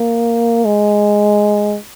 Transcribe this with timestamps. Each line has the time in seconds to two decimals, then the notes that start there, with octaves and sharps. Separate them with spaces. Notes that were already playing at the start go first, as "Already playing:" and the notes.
Already playing: A#3
0.65 G#3